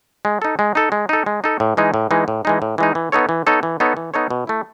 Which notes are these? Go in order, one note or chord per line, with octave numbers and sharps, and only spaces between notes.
G#3
D#4 A4
G#3
D#4 A4
G#3
D#4 A4
G#3
D#4 A4
A2
E3 G#3 D#4
A2
E3 G#3 D#4
A2
E3 G#3 D#4
A2
E3 G#3 D#4
E3
B3 D#4 A4 C#5
E3
B3 D#4 A4 C#5
E3
B3 D#4 A4 C#5
E3
B3 D#4 A4 C#5
B2
A3 E4